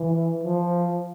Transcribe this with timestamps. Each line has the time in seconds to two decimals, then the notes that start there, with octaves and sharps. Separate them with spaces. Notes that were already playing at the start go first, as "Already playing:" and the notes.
Already playing: E3
0.44 F3